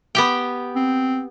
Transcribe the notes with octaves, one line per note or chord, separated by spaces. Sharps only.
B3 G4 G5
C4